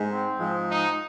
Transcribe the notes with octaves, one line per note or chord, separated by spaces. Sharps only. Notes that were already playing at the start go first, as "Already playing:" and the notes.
Already playing: G#2 G#3
C4
G#2 F3 G#3
D#4